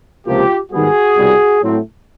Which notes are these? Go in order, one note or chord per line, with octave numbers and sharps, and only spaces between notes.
C#2 C3 F3 A#3 F4 G4
G#2 D#3 G3 B3 F#4 G#4
C2 B2 G3
A2 F#3 A3 C4